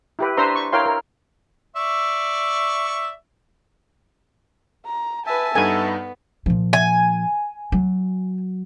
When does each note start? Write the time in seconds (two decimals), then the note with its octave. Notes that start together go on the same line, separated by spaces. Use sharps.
0.19 E4 G4 B4
0.37 D4 B4 C5 E5 A#5 C6
0.55 C#6
0.72 E4 A#4 C#5 F5 G5 C6
0.86 A#4
1.76 D5 E5 C#6
4.86 A#5
5.27 B4 E5 G#5 A5
5.55 G2 B3 D#4 A4 G#5
6.46 A#2 F3
6.73 G#5
7.72 F#3